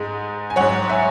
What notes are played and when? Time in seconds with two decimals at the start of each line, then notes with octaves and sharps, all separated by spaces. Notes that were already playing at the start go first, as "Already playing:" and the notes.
Already playing: G#2 G#3
0.50 G#5
0.56 G#2 F#3 C#5 F#5
0.89 E5 G#5